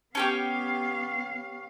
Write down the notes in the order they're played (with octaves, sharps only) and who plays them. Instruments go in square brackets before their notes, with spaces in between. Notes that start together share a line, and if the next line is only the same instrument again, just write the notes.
[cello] B3 F5 [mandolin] C#4 G4 C#5